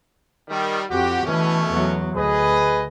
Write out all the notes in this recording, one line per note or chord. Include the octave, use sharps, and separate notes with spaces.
D#3 G3
F2 F#4 G4
B2 E3 A3 C#4
E2 F#3
D2 G#4 B4 D#5